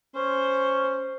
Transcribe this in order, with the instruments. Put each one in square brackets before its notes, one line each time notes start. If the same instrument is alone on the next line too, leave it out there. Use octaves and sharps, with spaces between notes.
[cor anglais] C#4 [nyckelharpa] C5